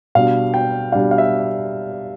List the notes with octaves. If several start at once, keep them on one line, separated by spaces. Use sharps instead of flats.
B2 G3 D4 F5
G5
B2 G3 D4 F5
F5
E5